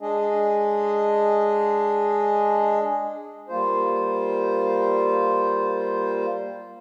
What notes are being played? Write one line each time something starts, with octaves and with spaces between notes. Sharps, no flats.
G#3 D4 G#4 D#5
G3 A#3 F4 C5